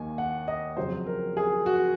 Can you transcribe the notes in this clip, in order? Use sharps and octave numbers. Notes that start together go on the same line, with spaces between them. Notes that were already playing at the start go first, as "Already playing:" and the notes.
Already playing: D#2 D#3 A#3 G#5
F#5
D#5
F2 C#3 F#3 C4 C5
A#4
G#4
F#4